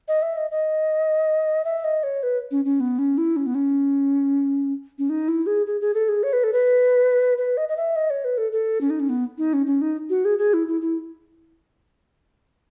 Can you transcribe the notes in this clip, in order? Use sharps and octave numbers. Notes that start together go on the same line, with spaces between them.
D#5
E5
D#5
D#5
E5
D#5
C#5
B4
C#4
C#4
B3
C#4
E4
C#4
B3
C#4
C#4
D#4
E4
G#4
G#4
G#4
A4
G#4
C#5
B4
A4
B4
B4
D#5
D#5
E5
D#5
C#5
B4
A4
A4
C#4
D#4
C#4
B3
D#4
C#4
C#4
D#4
F#4
G#4
G#4
E4
E4
E4